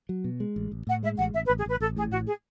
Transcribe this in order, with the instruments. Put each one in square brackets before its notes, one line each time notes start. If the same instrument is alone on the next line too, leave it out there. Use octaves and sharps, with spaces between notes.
[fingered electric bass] F#3
B2
G#3
A1
A1
[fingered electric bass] A2 [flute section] F#5
[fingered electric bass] G#3 [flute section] E5
[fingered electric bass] A1 [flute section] F#5
[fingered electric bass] A1 [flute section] E5
[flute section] B4
[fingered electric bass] A1
[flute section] G#4
[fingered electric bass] A1 [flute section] B4
[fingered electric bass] A1 [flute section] A4
[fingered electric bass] A2 [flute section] G#4
[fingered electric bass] A1 [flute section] F#4
[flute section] G#4